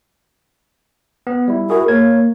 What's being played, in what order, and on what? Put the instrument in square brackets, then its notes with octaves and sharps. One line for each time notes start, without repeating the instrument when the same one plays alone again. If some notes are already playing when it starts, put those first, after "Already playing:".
[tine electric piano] B3
G3 E4
[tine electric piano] E4 F#4 G#4 [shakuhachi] A#4
[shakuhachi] A#3 [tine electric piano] A#4 C#5 G#6